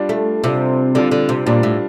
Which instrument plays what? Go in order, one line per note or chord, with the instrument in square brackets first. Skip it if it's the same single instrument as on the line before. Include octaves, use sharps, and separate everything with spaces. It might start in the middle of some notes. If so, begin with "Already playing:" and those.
Already playing: [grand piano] G3 D4 F4
[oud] A3
[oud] C3 [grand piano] G3 D4 F4
[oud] D3 [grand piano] G3 D4 F4
[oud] D3
C3
[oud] A#2 [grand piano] G3 D4 F4
[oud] A2